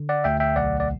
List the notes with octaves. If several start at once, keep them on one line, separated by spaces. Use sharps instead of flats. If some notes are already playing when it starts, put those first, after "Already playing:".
Already playing: D3
D5 F#5
D2 E5 G5
E5 G5
B1 D5 F#5
D5